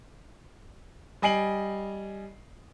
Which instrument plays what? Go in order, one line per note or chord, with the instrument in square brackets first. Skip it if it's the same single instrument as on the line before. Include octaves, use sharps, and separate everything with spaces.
[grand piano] G3 D#5 G#5 C7 D7 F#7